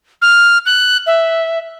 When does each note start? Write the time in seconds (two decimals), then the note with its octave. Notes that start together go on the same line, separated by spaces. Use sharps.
0.22 F6
0.66 F#6
1.07 E5